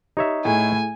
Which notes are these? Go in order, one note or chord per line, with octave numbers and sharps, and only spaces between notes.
D#4 G4 C#5 E5
A2 E4 G#4 A4 G#5